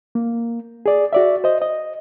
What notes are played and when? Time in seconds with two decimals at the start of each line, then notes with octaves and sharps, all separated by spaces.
0.15 A#3
0.86 G#4 D5
1.13 F#4 D5 E5
1.44 C5 D#5
1.62 D#5